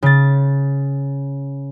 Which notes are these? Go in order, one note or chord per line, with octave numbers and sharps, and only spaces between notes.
C#3 A6